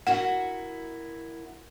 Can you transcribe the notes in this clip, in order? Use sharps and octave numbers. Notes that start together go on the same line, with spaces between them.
A#3 E4 F#4 F#5